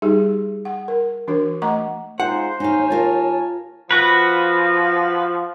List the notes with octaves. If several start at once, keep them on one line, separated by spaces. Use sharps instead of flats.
G3 D#4 G4 G#4
F#5
A#4
E3 D4 F#4 A#4
A3 D#5 F#5 A#5 C#6 D6
G#3 D#4 F4 C5 F#5
D#2 D#4 C#5 F5 G#5
F4 A#4 F5 A5
F3 F#4 B4